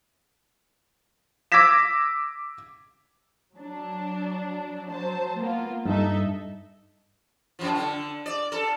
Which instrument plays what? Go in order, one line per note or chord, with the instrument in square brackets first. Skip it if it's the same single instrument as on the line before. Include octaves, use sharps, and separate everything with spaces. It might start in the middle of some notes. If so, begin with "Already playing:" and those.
[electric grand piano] D6 E6 G#6 A#6 B6 E7
[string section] F#3 D4
F#3 C5 A5
A#3 B3 F4
[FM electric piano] G2 [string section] D#4 A4 E5
[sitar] F#2 F3
D3
D5
A4